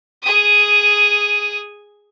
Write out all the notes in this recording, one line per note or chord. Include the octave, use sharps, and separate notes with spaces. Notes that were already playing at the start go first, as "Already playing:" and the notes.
G#4 D#6